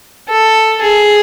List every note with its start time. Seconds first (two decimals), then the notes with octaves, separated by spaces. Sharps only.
0.29 A4
0.81 G#4